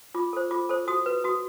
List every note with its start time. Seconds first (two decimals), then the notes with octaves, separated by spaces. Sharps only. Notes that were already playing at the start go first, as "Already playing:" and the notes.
0.15 F4 D6
0.33 A4 C5
0.51 F4 D6
0.69 A4 C5
0.88 F#4 D#6
1.06 B4
1.24 F#4 D#6